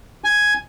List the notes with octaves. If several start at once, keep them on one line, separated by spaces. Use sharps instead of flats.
G#5